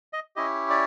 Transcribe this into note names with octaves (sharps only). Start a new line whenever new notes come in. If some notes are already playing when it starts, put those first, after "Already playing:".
D#5
C#4 E4 G4 D#5
D5